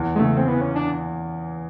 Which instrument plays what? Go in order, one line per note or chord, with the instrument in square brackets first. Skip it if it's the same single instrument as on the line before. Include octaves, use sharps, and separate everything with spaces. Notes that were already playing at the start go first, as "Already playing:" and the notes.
Already playing: [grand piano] E2
[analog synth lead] G#3
[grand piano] C#3 [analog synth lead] A3
[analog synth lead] C4
[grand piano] E3 [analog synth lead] B3
[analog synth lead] C#4
D4